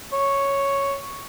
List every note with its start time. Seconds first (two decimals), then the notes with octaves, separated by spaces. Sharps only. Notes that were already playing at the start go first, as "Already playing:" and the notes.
0.13 C#5